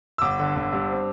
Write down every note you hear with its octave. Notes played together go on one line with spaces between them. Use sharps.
E6
G1 D6
D3
G1
G2
C4